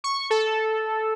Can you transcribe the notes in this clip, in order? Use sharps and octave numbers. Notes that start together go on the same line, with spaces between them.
C#6
A4